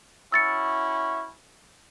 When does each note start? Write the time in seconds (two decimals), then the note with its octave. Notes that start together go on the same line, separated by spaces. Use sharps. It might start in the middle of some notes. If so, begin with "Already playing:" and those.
0.32 C#4 E4 F#4 E6 A6 C#7